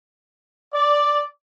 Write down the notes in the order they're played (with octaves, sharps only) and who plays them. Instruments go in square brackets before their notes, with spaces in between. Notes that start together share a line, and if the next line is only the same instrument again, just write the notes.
[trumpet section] D5